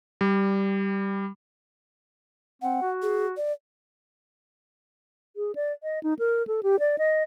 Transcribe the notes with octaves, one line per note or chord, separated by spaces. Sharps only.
G3
C4 F#5
F#4
G#4
D5
G#4
D5
D#5
D#4
A#4
A4
G4
D5
D#5